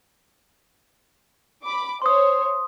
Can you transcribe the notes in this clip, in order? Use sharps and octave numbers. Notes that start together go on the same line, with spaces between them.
B5 D6
C5 C#5 C6 D#6